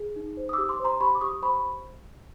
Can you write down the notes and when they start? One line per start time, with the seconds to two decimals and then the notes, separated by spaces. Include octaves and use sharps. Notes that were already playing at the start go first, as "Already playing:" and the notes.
Already playing: G#4
0.16 D#4
0.37 C5
0.49 D#6
0.53 D6 E6
0.58 G4
0.69 C6 D6
0.79 C5
0.84 A#5 C6
1.01 G4 B5 C#6
1.15 D6
1.21 G4 C#6 D#6
1.42 C5 B5 C#6